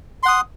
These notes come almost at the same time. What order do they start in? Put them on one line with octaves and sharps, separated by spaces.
C6 F#5 D#6